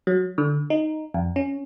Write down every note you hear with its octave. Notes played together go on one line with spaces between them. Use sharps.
F#3
D3
D#4
F2
C#4